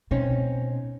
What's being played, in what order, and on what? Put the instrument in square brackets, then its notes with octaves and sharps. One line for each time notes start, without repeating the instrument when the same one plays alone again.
[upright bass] B2 [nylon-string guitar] C4 C#4 D#4